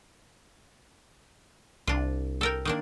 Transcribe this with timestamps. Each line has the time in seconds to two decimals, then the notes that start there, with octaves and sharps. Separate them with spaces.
1.87 C2 D4 F4
2.41 A4 A#4 G5
2.65 D#3 A#3 D4